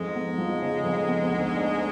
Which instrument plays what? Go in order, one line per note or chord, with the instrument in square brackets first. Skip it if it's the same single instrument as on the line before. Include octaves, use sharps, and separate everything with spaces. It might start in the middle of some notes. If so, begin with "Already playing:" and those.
Already playing: [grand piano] F2 [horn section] G#2 G#3
[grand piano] B3
F3
C#3
F2
B3
D2
D4